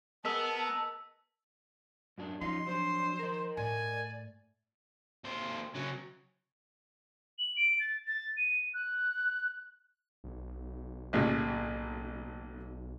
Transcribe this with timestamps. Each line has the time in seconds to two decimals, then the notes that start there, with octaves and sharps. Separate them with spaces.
0.25 B3 G#4 A#4 D#5 A5 E6 B6
2.18 F#2 F#3 D4
2.41 F3 C#4 D#4 F4 C6
2.67 F#3 D4 C5
3.19 A#4 D#5
3.57 A2 D5 G#5
5.24 D#2 C5
5.74 C#3 F#3
7.39 F#7
7.57 D7
7.80 A6
8.07 A6
8.37 D#7
8.74 F#6
10.24 B1
11.13 A1 A#2 C#3